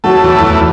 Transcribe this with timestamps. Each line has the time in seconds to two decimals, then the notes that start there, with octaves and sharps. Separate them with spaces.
0.04 F#3 A3 F#4
0.24 E2
0.44 E2